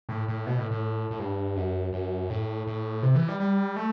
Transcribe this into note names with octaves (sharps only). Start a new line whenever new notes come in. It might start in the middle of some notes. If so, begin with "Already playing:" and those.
A2
A2
B2
A2
A2
A2
G2
F#2
F#2
A2
A2
C3
E3
G3
G3
A3